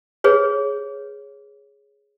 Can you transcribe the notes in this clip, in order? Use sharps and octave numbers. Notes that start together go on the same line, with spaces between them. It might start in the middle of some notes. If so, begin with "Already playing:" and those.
G#4 B4 C#5